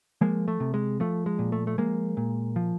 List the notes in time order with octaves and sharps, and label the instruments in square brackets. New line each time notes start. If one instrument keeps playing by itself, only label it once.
[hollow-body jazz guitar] F3 G#3 A#3
A3
C3
G#3
F3 A3
G#3
A#2
A3
A3
F3 G#3 A#3
A#2
F3